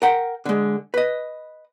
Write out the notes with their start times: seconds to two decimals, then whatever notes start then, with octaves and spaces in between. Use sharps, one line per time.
0.02 A#4 F#5 G5
0.45 D3 G#3
0.94 B4 D#5